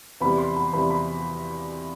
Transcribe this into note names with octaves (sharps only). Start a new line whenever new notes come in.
E2 C3 G3 B5
C6
B5
E2 C3 G3 B5
B5